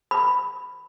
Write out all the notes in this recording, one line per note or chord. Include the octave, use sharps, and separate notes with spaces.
B5